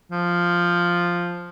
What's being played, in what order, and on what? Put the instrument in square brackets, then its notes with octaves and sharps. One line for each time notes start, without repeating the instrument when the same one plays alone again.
[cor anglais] F3